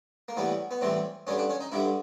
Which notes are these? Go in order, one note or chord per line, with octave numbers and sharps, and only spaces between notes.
A#3
A2 E3 G3 B3
B3
A2 E3 G3 C4
G2 D3 G3 C#4
D4
C#4
D#4
G2 D3 G3 E4